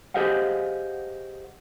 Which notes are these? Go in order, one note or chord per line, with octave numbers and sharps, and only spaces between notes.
G4 G#4 C5 D#5 F5 F#5